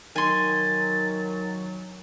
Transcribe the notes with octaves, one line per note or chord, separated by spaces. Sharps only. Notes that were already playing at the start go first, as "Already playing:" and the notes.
D#3 F#3 G#5 C6 A6